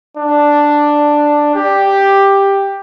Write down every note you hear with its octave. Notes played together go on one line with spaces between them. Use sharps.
D4
G4